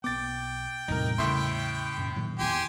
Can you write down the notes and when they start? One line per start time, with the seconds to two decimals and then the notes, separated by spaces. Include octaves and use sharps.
0.04 B1 B3 G5 D6 A6
0.88 E2 A2 C3 G3 D#4 A#4
1.18 A2 C#3 E5 C6
1.97 D#1 F#2 A#2
2.16 A#2 D#3 F#3
2.39 E2 B3 G4 G#5 C6